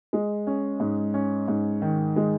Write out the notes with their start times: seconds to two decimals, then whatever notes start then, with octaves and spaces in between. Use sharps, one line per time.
0.13 G#3
0.47 C#4
0.80 G#2
1.14 C#4
1.48 G#2
1.82 D#3
2.16 G#3